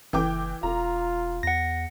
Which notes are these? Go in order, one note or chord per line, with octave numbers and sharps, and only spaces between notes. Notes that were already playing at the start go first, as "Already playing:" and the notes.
F#1 E3 G5 D6
E1 F4 A#5
E2 F#5 A#6